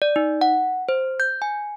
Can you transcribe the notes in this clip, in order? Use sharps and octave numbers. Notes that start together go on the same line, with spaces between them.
D5
D#4
F#5
C5
G6
G#5